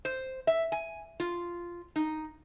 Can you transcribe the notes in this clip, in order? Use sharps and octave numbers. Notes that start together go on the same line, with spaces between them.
C5
E5
G#5
F4
D#4